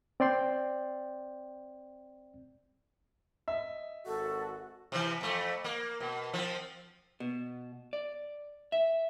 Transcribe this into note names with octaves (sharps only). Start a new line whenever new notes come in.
C4 D5 G5 C6
D#5 E5
G#1 F#4 A4
C3 E3
F2 A3
A#3
B2
F3 C4
B2
D5
E5